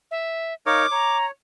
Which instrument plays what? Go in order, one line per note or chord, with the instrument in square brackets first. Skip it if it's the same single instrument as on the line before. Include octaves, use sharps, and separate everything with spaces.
[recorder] E5
[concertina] D#4 A#4 C#5 [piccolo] F5 [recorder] D6
[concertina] C#5 [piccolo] A#5